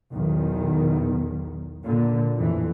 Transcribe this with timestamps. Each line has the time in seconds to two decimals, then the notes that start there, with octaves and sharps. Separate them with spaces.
0.13 B1 E2 D#3
1.84 A#2 D3
2.37 A1 F2 E3